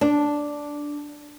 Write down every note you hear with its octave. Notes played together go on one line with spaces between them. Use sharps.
D4